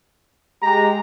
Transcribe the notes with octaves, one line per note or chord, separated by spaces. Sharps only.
G#3 G4 A#5